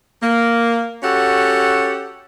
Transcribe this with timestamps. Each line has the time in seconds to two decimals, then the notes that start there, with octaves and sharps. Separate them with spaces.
0.22 A#3
1.02 C#4 F#4 G4 A4 F#5